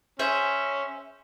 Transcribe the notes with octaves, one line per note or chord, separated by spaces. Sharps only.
C#4 G#4 C5 E5